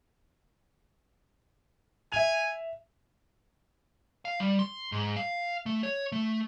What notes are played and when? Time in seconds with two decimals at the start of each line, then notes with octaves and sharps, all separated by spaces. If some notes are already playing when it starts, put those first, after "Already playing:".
2.12 E5 G#5 F7
4.25 F5
4.40 G3
4.59 C6
4.92 G#2
5.16 F5
5.66 A3
5.83 C#5
6.12 A3